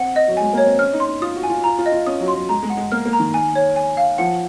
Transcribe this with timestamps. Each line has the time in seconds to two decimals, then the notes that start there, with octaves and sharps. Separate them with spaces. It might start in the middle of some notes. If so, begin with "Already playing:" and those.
Already playing: C4 F#5
0.16 D#5
0.28 F#3
0.37 G#3 G#5
0.53 A#3 C#5
0.66 C4
0.79 C#4 F6
0.93 D#4
1.00 C6
1.07 D#4
1.22 F4 D#6
1.36 F#4
1.43 G#5
1.50 F4
1.64 F4 A#5
1.78 F4
1.86 D#5
1.92 F4
2.06 C#4 D#6
2.21 F#3
2.28 C6
2.35 F#3
2.49 G#3 A#5
2.63 G#3
2.70 F#5
2.77 G#3
2.92 A#3 F6
3.06 A#3
3.13 A#5
3.20 D#3
3.34 G#5
3.55 C#5
3.76 G#5
3.97 F5
4.18 F3 F#5